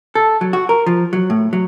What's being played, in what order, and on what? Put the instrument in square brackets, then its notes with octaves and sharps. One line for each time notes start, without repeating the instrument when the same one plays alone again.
[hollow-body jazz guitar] A4
F#3
F#4
A#4
F3
F#3
A2
F#3